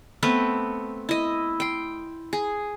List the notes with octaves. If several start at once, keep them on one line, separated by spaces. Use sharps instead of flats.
A3 B3 C4 B4
E4 D#5
G5 C6
G#4